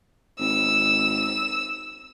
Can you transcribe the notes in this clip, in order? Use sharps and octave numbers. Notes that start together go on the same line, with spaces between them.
G#1 E6